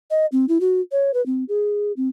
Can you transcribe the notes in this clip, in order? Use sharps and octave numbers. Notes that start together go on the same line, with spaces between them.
D#5
C4
E4
F#4
C#5
B4
C4
G#4
C4